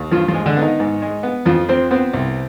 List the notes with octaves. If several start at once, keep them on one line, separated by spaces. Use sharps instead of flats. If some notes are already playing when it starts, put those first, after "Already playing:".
Already playing: D#2
G2 F3 F4
F3 F4
G#3
D3 D4
B3
D#3 D#4
G#2
G#3
B3
F2 F3 F4
F3 C4 C5
B3 C4 C5
C2